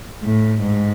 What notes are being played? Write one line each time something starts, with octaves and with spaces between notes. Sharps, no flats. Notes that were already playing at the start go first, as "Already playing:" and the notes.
A2
G#2